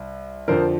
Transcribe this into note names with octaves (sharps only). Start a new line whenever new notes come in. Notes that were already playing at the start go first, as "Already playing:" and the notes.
Already playing: C2
F2 D3 F3 A#4 C5